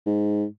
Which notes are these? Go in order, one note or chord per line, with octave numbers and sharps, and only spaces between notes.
G#2